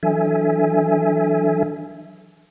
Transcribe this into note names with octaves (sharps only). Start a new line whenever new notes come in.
E3 F#3 D4 A4 E5 G#5